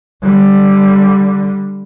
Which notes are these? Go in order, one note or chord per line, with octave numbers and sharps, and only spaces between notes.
D3 G3